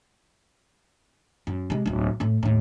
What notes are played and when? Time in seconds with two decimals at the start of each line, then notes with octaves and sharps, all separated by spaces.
1.47 F#2
1.70 C3 G#3
1.86 D1 B1
2.20 A2 A3
2.43 D#2 A2